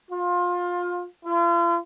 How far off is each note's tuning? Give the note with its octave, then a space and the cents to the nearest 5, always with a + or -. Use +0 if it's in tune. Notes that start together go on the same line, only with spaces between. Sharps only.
F4 +20
F4 -40